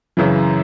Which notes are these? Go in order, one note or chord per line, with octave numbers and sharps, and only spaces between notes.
F#2 C#3 E3